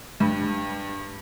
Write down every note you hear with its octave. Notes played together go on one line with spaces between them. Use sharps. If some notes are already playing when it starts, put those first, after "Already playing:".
G2